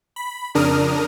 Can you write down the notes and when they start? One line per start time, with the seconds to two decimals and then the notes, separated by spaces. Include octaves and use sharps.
0.16 B5
0.55 F2 C#3 D4 A#4 D#6 F6